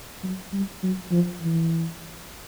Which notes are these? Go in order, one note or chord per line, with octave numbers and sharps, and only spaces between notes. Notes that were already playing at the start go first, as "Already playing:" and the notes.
F#3
G3
F#3
F3
E3